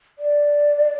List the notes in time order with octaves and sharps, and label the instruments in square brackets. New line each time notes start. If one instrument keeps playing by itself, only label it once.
[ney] D5